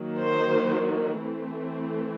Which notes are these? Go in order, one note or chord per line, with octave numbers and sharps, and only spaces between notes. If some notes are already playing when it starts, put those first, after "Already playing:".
Already playing: D#3 F#3 A#3
C5
E3 A3 C4